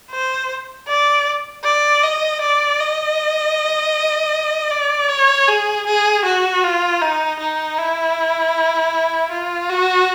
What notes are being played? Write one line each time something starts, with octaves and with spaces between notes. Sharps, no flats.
C5
D5
D5
D#5
D5
D#5
D5
C#5
G#4
G#4
F#4
F4
D#4
D#4
E4
F4
F#4